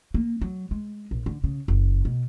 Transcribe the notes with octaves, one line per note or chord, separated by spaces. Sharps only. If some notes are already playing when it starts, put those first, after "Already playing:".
A#3
F#3
G#3
A#1
D3
C#3
F#1
B2